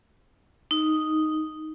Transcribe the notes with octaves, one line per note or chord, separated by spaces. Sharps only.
D#4